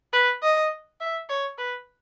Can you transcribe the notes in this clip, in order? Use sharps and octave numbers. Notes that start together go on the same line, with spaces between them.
B4
D#5
E5
C#5
B4